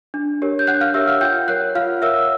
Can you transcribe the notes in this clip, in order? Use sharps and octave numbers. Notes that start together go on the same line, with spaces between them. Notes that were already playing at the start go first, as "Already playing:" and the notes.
D4
G4 A#4 C#5
G6
D4 F#5 F#6
F5 F6
G4 A#4 C#5 E5 E6
F5 F6
F4 G5 G6
A#4 C#5 F#5 F#6
F4 F5 F6
A#4 C#5 E5 E6